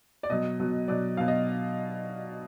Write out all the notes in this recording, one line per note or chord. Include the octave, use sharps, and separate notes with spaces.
D5
B2 F#3 D#5
B2 F#3
B2 F#3 D5
B2 F#3 F5
D#5